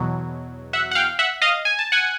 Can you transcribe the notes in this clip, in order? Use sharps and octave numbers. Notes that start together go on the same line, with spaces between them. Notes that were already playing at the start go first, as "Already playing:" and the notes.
Already playing: E2 B2 F#3
E5 F#5
F#5
F5 G5
E5 F#5
D#5 F5
G#5
A5
F#5 G#5